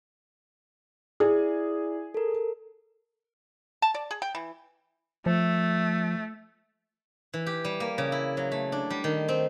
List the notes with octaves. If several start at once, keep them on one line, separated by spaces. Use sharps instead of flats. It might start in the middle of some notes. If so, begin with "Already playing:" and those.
E4 G#4 D5
A4 A#4
A5
D5
G#4
G5
E3
F3 A3
E3
G4
G3
A#3
C#3
E4
F#3
A3
D4
G3
D#3
C4